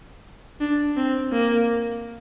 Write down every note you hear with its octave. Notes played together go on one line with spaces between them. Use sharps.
D4
C4
A#3